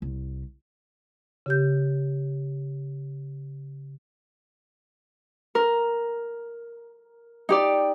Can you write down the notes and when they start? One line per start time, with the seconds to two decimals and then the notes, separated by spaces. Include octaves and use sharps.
0.02 C2
1.46 C#3 G4 G6
5.55 A#4
7.49 D#4 G4 D5